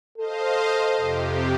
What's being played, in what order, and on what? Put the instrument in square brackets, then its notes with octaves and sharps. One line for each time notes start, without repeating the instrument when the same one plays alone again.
[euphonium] A4 [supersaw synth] C5 D#5 F5
[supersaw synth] F2 C3 G4